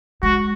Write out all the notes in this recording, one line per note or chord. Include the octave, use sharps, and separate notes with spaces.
G#3 F#4